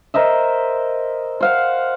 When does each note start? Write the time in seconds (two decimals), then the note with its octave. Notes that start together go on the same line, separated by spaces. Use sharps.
0.14 A#4 C5 D#5 E5
1.40 C5 F5 F#5